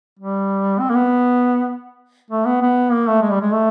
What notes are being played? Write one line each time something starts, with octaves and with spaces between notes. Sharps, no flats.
G3
C4
A#3
B3
A3
B3
B3
A#3
A3
G#3
G3
G#3
A3